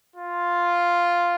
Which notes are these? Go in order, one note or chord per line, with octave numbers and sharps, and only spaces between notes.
F4